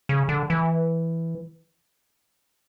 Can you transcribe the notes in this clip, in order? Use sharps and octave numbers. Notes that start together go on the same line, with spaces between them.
C#3
D3
E3